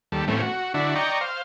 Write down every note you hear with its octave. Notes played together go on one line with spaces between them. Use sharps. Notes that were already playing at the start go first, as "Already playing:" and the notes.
D#2 G3 A4
A2 E3 A3 C4 C#4
F#4
D3 D4 E4 F#4
D5 D#5 G5 A#5 C#6
C5 F5